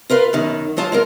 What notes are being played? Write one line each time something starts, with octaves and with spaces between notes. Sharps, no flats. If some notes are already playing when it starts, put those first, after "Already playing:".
F4 A#4 B4 F5
F#2 B2 D#3
F#3 G#3 F4 A5
G#3 F4 A#4